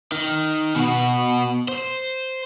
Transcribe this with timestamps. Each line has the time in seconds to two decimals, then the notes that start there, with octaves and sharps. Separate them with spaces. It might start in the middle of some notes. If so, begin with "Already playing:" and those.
0.12 D#3
0.76 B2 F#4
1.68 C5